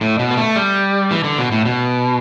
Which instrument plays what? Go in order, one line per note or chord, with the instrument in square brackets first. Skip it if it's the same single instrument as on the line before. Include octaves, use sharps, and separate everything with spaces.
[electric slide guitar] A2
B2
B3
A3
G3
E3
D3
B2
A2
B2